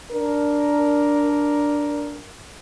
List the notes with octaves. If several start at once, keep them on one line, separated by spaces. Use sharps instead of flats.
D4 A#4